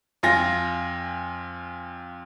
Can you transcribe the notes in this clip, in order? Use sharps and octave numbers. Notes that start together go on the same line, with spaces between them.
F2 F4 G#5 A#6